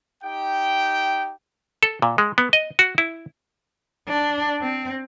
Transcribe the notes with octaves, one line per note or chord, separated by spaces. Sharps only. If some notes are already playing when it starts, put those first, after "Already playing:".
D#4 G4 G5
A4
A#2
G#3
B3
D#5
F#4
E4
D4
C4